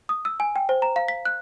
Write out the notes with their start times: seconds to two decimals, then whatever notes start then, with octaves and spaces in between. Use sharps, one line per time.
0.09 D#6
0.25 E6
0.40 G#5
0.56 G5
0.69 C5
0.82 A#5
0.96 F5
1.08 B6
1.25 F#6